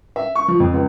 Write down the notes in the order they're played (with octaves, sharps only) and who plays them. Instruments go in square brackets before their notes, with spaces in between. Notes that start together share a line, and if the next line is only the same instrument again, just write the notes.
[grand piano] E5
C#6
F3
F2
C#2